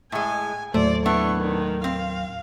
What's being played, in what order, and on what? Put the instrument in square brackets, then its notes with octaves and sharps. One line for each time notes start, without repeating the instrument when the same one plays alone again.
[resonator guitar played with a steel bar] A2 G#3 [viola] G#5
[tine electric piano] D#2 A2 F#3 [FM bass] A3 [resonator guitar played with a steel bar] C5 [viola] D5
[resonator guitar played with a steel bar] B3 D4 E4 [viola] C#6
[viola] D#3
[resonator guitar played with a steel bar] C4 [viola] F5